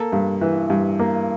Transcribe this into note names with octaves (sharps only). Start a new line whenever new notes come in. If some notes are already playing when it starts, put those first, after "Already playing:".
Already playing: A#3 A4
G2
E3
G2
A#3